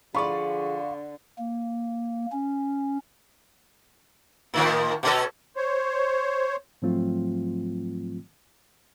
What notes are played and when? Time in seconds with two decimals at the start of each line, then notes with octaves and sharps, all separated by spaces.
0.15 D3 F3 F4 G#4 D5 B5 C#6
1.39 A#3
2.32 C#4
4.54 A2 D#3 F3
5.03 B2 C#4 A4
5.56 C5 C#5
6.82 G#2 F3 F#3 A3 C4 F4